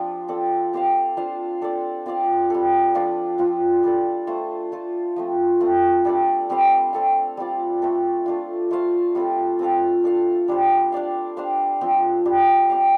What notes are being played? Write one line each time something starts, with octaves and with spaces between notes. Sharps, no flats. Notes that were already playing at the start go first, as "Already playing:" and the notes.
Already playing: F3 C4 D4 F4 G4 D5
C4 A4 D5
C4 G4 C5 F5
D4 F4 C5 F5
D4 A4 D5
C4 F4 D5 F5
G3 C4 A4
F3 D4 F4 D5
F3 C4 F4
G3 D4 A4 D5
A3 F4 C5
A3 F4 A4
F3 A3 C4
A3 C4 F4
G3 D4 A4 D5
G3 C4 G4 F5
C4 A4 F5
G3 C4 F4 D5
A3 C4 A4
A3 D4 F4
A3 F4 C5 F5
G3 C4 F4 A4
C4 F4 A4 F5
D4 A4 F5
G3 D4 G4 C5
D4 G4 D5 F5
D4 G4 C5 F5
F3 C4 G4
G3 D4 G4
C4 G4 F5